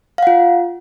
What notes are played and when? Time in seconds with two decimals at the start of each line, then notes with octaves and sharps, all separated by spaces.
0.18 F5
0.23 F#5
0.27 F4